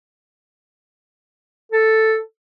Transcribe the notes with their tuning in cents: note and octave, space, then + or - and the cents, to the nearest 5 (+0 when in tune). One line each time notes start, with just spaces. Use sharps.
A4 +5